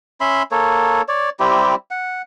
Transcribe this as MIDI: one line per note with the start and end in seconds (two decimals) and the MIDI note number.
0.21 0.43 61
0.21 0.43 76
0.21 0.43 83
0.21 0.43 84
0.51 1.02 58
0.51 1.02 69
0.51 1.02 73
1.08 1.30 73
1.08 1.30 74
1.40 1.75 55
1.40 1.75 60
1.40 1.75 64
1.40 1.75 67
1.91 2.22 78